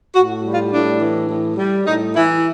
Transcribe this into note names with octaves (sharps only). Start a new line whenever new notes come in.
A2 F#4
G3
F4
A2 D4
E3
A2
G3
A2 D#4
E3 E4